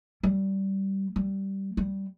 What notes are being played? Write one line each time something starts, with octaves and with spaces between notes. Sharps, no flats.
G3
G3
G3